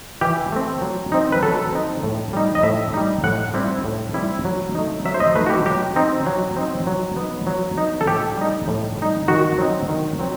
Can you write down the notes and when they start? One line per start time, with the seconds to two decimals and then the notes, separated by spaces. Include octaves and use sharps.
0.21 E3 G4
0.52 A3 C4
0.82 F#3
1.12 C4 D#4
1.32 B4
1.43 F#3 A4
1.73 C4 D#4
2.03 A2
2.33 G3 D#4
2.55 D#5
2.63 A2 E5
2.94 G3 D#4
3.24 A2 F#5
3.54 G3 C4 E4
3.85 A2
4.14 G3 C4 E4
4.45 F#3
4.75 A3 D#4
5.05 F#3 E5
5.14 C5
5.20 D#5
5.35 A3 D#4 B4
5.46 F#4
5.50 G4
5.66 F#3 G4
5.96 C4 D#4
6.26 F#3
6.56 C4 D#4
6.87 F#3
7.16 B3 D#4
7.47 F#3
7.77 B3 D#4
8.01 A4
8.07 A2 G4
8.37 G3 D#4
8.68 A2
8.98 G3 D#4
9.28 D#3 F#4
9.58 F#3 C4 D#4
9.89 D#3
10.19 F#3 C4